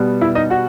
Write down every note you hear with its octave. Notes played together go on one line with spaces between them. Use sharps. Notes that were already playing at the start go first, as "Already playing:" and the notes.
Already playing: B2 G3 B3
E4 E5
D#4 D#5
F#4 F#5